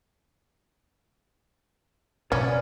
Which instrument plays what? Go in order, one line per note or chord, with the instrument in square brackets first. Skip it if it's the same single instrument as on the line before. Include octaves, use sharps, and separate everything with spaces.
[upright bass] B2 [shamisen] C#4 [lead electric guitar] D5